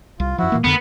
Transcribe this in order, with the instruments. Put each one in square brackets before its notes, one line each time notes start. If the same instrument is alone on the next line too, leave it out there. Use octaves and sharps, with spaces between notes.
[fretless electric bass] C2 [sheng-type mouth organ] F4
[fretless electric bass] F#2 F3 [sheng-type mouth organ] E4 F#4
[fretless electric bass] A#2 E3 A#3
[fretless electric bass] F2 D3 [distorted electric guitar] B3 [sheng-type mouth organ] A#4